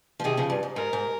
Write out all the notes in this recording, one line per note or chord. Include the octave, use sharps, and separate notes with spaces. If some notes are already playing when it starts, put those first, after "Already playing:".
F3
C3 D#3 G#4
C#3 F3
G2
G#2
G#2 A#4
G#2